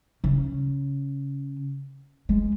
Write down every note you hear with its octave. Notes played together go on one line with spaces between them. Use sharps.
C#3
G#3